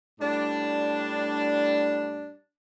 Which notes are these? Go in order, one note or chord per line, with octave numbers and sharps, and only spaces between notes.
A2 G3 D4